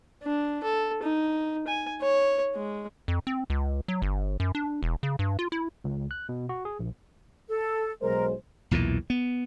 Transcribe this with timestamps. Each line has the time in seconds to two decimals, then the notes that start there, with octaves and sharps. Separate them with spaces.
0.23 D4
0.63 A4
1.03 D#4
1.67 G#5
2.01 C#5
2.55 G#3
3.08 F2
3.27 C4
3.50 C#2
3.88 F#3
4.02 G1
4.40 F#2
4.55 D4
4.83 E1
5.03 C#3
5.19 G2
5.39 F4
5.52 E4
5.84 C#2
6.11 F#6
6.29 B2
6.49 F#4
6.65 G#4
6.79 A#1
7.49 A4
8.02 B1 G#3 A#4 C5
8.71 B1 E2 A#2 E3
9.10 B3